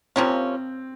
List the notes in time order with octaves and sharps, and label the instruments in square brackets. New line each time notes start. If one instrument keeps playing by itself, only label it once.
[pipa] C3 F3 A#3 C#4 [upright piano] C4